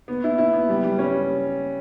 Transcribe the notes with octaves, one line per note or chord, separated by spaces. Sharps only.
B3
E4
E4
B3
G3
G3
C#4